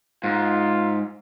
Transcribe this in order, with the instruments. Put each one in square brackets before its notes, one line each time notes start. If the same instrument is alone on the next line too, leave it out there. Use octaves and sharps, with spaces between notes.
[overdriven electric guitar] G#2 [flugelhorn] F4